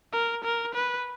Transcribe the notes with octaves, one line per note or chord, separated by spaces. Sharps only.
A#4
A#4
B4